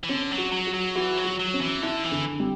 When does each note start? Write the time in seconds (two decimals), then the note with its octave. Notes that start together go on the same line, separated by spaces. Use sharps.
0.03 E3
0.09 D3 C#4
0.31 F#3
0.37 F#4
0.52 F#3
0.67 F#4
0.74 F#3
0.95 E3 F#4
1.18 F#3
1.24 F#4
1.40 F#3
1.54 C#4
1.61 E3
1.82 D3 E4
2.04 E3
2.11 D3
2.40 G3